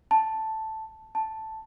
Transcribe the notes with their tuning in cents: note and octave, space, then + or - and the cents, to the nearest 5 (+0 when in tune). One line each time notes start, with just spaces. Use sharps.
A5 +0
A5 +0